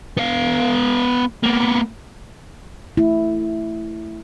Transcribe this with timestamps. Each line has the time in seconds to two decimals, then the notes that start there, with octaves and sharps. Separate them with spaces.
0.17 B3 F5
1.43 A#3 B3
2.97 A3 E4